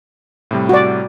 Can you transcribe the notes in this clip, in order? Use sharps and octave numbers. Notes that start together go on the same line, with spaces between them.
A2 C3 G3
F#4 D5